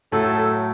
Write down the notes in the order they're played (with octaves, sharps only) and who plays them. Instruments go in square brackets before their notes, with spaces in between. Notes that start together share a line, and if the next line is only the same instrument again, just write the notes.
[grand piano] A2 F#3 A3 [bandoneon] A4